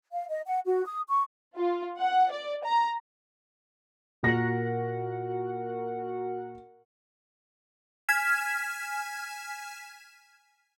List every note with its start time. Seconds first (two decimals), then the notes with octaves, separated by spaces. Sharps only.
0.13 F5
0.29 D#5
0.46 F#5
0.66 F#4
0.85 D#6
1.08 C#6
1.56 F4
1.99 F#5
2.32 D5
2.64 A#5
4.23 A#2 F#4 A#4 F#5 A#6
8.09 G#5 F6 G#6 B6 E7